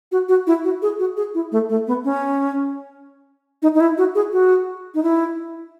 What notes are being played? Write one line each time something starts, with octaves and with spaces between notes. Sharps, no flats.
F#4
F#4
E4
F#4
G#4
F#4
G#4
E4
A3
A3
B3
C#4
D#4
D#4
E4
F#4
G#4
F#4
D#4
E4